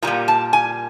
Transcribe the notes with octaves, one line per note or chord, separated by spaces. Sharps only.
A#2 G3 A#3 A#5
A5
G#5